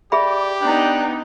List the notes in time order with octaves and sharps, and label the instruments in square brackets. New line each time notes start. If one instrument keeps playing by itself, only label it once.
[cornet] G4 [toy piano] G#4 E5 B5 [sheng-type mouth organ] D5
[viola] B3 D#4 [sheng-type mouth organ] D4 G5 F#6